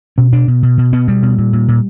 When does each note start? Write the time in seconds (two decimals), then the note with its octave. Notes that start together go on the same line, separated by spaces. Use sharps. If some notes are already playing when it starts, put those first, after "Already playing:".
0.18 B2 C#4
0.32 B2 D4
0.48 B2
0.63 B2
0.78 B2
0.93 B2 B3
1.08 B2 G3
1.22 B2
1.38 A#2
1.53 A#2
1.68 A#2